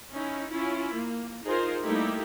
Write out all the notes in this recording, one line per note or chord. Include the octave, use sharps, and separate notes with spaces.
C#4 D#4 E4
C#4 E4 F4
A#3
D#4 F4 G#4 A#4 C5
G3 A3 A#3 D#4 E4 G4